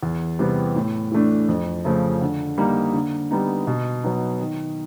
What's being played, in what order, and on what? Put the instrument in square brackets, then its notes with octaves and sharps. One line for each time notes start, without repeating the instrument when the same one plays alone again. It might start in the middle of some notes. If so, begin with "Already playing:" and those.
[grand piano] E2
C3 E3 G3 B3
A2
E3 A3 D4
F2
C#3 F3 A3
D3
G3 A#3 D#4
D3
G3 B3 D#4
B2
F#3 B3 D#4
D#3